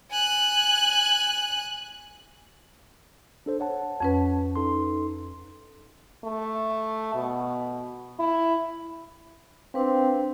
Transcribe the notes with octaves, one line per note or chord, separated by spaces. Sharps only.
G#5 F#6
D4 A4 C5
C#5 F#5 A5
F2 C#4 B4
D#4 A4 C6
A3
B2
E4
C4 D4 B4 F5